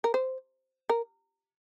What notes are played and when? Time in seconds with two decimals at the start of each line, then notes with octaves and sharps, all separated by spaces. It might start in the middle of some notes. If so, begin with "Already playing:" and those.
0.04 A#4
0.14 C5
0.89 A#4